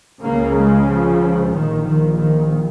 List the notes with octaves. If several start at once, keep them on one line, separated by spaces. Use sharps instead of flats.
C#2 C#3 A#3
G#3
F3
A#1 A#2 D#3
D#3
D#3